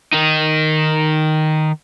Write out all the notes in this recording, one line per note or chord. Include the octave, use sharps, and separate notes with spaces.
D#3 D#4